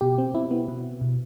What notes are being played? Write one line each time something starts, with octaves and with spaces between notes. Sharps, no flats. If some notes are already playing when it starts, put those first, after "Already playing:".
B2 G4
C4
B2 E4
B3
B2
B2